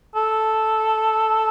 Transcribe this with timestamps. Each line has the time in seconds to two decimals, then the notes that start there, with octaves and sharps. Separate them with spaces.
0.15 A4